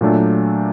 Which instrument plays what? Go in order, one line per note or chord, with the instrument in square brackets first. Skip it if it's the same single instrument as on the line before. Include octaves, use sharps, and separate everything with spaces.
[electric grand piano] A#2 F#3 A3 D4